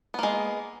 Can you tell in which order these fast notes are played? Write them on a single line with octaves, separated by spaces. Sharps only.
B3 A#3 G#3